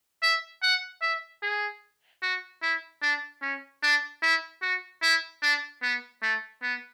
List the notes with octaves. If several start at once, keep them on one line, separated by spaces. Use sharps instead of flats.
E5
F#5
E5
G#4
F#4
E4
D4
C#4
D4
E4
F#4
E4
D4
B3
A3
B3